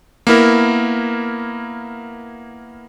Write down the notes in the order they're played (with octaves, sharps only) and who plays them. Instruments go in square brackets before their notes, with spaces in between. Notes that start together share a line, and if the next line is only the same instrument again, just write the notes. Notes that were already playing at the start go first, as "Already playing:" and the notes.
[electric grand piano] A#3 B3 E4 A#4